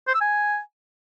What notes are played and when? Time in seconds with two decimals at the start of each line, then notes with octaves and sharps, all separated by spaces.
0.08 C5
0.14 E6
0.21 G#5